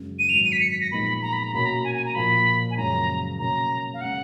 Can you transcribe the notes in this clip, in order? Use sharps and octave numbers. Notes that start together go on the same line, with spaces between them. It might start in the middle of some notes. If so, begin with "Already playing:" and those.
Already playing: F#2 C#3 G#3
D#7
G#1 G#2 F#3 F7
D#7
B6
C#7
B6
A#6
A#2 F3 G#3 B3 D#4 B5
A#5
B5
A#5
B2 A#3 C#4 F#4 B5
A#5
G#5
G#5
A#5
A#2 F3 A#3 B5
G#5
F#1 F#2 F3 G#3 C#4 A#5
B2 A#3 C#4 A#5
F5
C#3 G#3 C#4 F#5